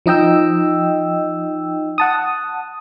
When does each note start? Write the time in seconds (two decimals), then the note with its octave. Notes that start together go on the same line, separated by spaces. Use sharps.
0.06 F3 D#4 D#5 G5 E6
1.98 F#5 A5 D#6